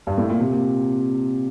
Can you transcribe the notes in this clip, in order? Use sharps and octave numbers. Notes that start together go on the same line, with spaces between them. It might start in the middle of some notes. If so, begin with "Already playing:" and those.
G2
A2
A#2
C3
A#2